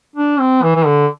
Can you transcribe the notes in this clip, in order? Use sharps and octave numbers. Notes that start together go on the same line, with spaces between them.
D4
C4
E3
E3
D3